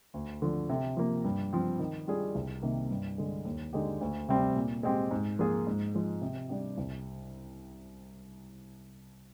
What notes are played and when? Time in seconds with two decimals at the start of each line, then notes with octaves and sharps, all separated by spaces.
0.14 D2
0.42 D3 F3
0.69 C3
0.97 F3 A#3
1.24 G2
1.53 F3 C4
1.79 D#3
2.07 G3 D4 F4 G#4
2.35 C2
2.62 C3 D#3 A#3
2.90 G2
3.18 D3 G#3
3.45 D#2
3.73 D3 G#3 D#4 G4
4.01 D2
4.29 C3 G3 C4
4.56 A#2
4.83 G#3 C4 G4
5.11 G#2
5.39 F3 A#3 F4 G#4
5.67 G#2
5.95 F3 G#3
6.21 C3
6.49 G3 D4 G4
6.77 C2